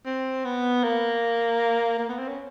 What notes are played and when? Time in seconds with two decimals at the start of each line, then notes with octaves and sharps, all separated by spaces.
0.06 C4
0.45 B3
0.84 A#3
1.99 A#3
2.09 B3
2.18 C4
2.29 C#4